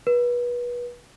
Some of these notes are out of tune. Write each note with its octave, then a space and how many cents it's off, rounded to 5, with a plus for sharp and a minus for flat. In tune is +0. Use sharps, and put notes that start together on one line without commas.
B4 -30